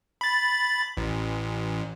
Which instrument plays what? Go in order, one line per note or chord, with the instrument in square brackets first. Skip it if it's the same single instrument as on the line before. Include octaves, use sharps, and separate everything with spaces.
[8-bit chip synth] B5 A6
A1